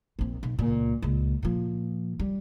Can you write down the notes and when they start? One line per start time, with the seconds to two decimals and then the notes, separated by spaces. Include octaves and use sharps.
0.19 A#1 C4
0.43 B1
0.59 C#2 A#2
1.02 C#2 A#2
1.43 A#2 F3
2.19 G3